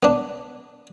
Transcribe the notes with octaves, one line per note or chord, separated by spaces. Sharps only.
B3 D4